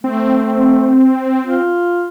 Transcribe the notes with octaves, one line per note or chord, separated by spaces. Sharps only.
A3 C4
F4